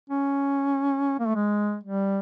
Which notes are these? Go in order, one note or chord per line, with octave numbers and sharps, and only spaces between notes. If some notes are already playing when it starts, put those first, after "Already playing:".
C#4
A#3
A3
G#3
G3